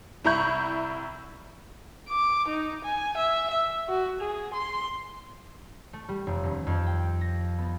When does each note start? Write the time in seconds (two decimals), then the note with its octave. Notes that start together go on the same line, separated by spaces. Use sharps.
0.25 C2 E4 A#5 B5 C#6 G6
2.09 D6
2.48 D#4
2.84 G#5
3.17 E5
3.51 E5
3.89 F#4
4.21 G#4
4.54 C6
5.93 A3
6.09 G3
6.27 F1
6.43 D#1
6.67 F2
6.86 G5
7.21 A#6
7.59 B3